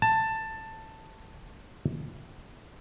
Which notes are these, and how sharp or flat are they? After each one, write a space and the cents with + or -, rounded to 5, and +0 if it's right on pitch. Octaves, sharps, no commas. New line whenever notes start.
A5 +10